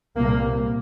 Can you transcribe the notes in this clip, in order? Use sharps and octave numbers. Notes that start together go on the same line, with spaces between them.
C2 A#2 A#3